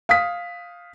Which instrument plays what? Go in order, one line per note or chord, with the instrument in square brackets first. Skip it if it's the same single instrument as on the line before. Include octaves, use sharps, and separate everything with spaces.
[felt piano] F5 D#6 B6